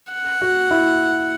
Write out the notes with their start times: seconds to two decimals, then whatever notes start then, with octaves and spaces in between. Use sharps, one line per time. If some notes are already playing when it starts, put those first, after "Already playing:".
0.13 F#5
0.41 F#4
0.71 E4